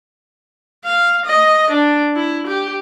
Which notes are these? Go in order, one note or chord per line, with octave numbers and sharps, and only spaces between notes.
F5
D#5
D4
E4
G4